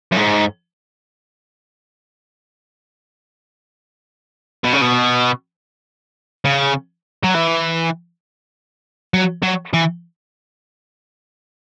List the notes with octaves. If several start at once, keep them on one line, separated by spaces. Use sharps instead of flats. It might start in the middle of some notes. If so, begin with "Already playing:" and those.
F#2
G#2
B2
C#3
B2
C#3
F#3
E3
F#3
F#3
E3